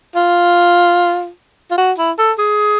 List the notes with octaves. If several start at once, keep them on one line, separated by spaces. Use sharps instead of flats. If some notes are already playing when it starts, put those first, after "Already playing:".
F4
F4
F#4
E4
A4
G#4